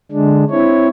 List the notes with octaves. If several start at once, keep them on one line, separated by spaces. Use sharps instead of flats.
D3 G#3 D4
C4 E4 C#5